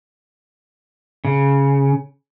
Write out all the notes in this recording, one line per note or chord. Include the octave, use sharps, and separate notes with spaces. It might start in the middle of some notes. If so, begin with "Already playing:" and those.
C#3